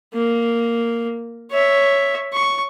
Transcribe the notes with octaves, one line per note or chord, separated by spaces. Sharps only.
A#3
C#5 E5
C#6